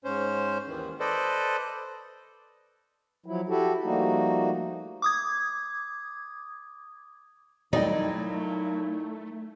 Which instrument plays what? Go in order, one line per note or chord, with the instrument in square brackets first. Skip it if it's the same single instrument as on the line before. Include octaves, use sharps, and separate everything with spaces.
[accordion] G#2 C#4 C5
D#2 D#3 E3
A4 B4 C5 D5 D#5
[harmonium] F3 F#3 E4
E4 F#4 G4 A4
F3 G3 A3 A#3 D#4 F#4
[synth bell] D6 D#6 G#6
[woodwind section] A#2 F#3 E4 [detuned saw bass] A3 [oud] D#4 [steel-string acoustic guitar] D5 D#5 G5